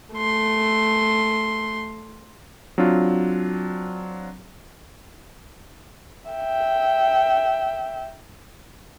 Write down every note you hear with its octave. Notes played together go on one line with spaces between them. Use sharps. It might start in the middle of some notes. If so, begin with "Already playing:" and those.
A3 C6
F#3 C4 D4 F4
E5 G5